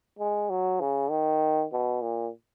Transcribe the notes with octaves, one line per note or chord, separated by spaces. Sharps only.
G#3
F#3
C#3
D#3
B2
A#2